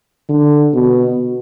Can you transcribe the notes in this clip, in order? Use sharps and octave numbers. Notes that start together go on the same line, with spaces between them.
D3
B2